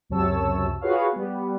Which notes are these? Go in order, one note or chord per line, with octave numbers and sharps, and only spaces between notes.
C#2 F#2 C3 C#5 A5 E6
F4 F#4 G#4 B4 C#5 F5
G3 B3